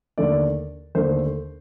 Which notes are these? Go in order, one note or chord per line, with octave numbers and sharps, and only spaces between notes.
D#2 D3 A3 D5
D#2 D3 A3 C5